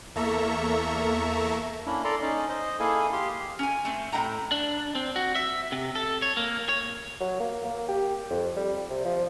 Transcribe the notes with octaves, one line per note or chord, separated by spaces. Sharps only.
E2 A#3 A4 E5 A#5 C#6
A#3 C#4 D4 E4
A4 D5 A#5 C6
C#4 D#4
C5 D#5
A#3 E4 G#4 A4 F5 G#5
G4 F5 C6
C#4 G#5
A3 C4
A2 A3 D#4 E5 G5 A#5
D4
C4
F#4
E5
C3
A4
C#5
A#3
C#5
F#3
A#3
A#3
G4
F2
G3
C3
F3